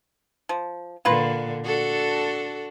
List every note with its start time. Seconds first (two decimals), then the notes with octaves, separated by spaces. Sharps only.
0.49 F3
1.05 A#2 D3 A#3 F4 B4
1.64 D4 F#4 A4